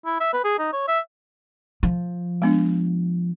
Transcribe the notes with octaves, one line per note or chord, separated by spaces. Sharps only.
E4
E5
B4
G#4
D#4
C#5
E5
F3
G#3 B3 D4